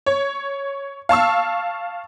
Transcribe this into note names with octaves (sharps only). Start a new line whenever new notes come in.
C#5
F5 A5 C#6 E6